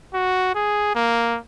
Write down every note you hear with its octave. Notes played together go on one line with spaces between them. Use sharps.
F#4
G#4
A#3